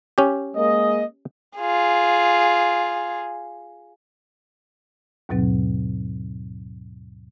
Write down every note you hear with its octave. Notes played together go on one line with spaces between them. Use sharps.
C#4 G4
G#3 A#3 D#5
F4 G#4
D#2 G#2 B2 F#3 C4